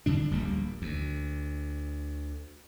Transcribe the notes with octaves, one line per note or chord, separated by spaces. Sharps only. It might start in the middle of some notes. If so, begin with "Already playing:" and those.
E2 D3 D4
D1 A#1 G3 A#3
D2